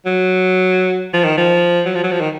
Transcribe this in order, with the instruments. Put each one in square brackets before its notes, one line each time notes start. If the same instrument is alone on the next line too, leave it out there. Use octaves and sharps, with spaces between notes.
[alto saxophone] F#3
F3
D#3
F3
F#3
F3
F#3
F3
D#3